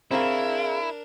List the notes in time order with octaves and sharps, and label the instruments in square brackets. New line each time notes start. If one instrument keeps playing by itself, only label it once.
[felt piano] C4 A#5 [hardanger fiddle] D4 A#4 [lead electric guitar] E4 [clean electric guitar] G#4 F5